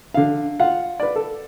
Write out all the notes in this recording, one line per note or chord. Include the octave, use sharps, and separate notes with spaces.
D3 F5
F4 F5 F#5
B4 D5
A4